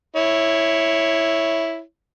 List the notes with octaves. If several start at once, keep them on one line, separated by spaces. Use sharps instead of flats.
E4 C#5